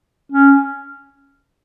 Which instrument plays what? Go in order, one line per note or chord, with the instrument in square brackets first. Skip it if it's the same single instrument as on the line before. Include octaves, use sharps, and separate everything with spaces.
[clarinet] C#4